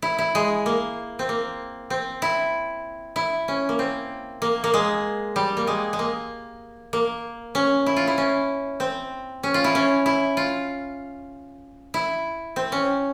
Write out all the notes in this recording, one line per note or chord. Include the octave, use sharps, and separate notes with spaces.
E4
E4
G#3
A#3
C4
A#3
C4
E4
E4
C#4
A#3
C4
A#3
A#3
G#3
G3
A#3
G#3
G#3
A#3
A#3
C#4
E4
F4
E4
C#4
C4
C#4
F4
E4
C#4
E4
F4
E4
C4
C#4